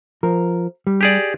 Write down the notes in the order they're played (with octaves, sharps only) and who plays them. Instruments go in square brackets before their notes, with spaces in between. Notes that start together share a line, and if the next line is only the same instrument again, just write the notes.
[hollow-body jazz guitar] F3 A#4
G3
[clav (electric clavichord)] G4 G#4 D5